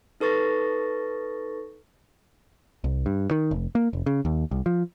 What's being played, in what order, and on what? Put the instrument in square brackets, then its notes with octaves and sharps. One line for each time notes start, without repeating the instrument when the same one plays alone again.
[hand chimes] D#4 A4 B4 C#6 A6 A#6
[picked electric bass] C2
G2
D#3
F1
A#3
F1
C#3
D#2
C2
F3